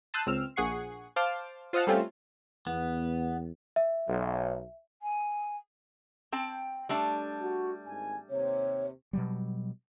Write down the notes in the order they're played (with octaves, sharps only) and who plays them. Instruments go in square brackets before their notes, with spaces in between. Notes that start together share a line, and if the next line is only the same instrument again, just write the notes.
[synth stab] A5 C6 D#6 E6 F#6 G6
C#2 C4 E6 F6
A#1 G#4 F#5 C#6 C7
C5 F5 A5 C6 D6 F6
F4 C5 D#5 F5 F#5 A5
G3 A3 C4 C#4 F4
[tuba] E2 [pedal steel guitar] B3
[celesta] E5
[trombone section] B1 F#3
[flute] G#5
[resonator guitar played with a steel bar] C4 G5 A5
G3 A3 D4
[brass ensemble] F#4
G#1 G#5
[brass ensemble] D#2 C3 [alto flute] C#5
[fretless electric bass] B2 F#3 G3